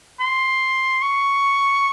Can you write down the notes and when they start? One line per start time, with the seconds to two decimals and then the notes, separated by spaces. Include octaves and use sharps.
0.20 C6
1.02 C#6